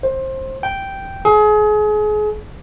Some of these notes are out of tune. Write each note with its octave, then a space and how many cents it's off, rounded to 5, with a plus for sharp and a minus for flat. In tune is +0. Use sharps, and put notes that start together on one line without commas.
C5 +20
G5 -5
G#4 +30